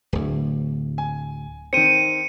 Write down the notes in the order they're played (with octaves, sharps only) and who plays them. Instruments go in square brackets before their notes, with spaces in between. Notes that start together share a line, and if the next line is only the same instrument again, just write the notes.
[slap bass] D1 D2
[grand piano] G#5
[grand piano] D#3 C4 [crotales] C#7 D#7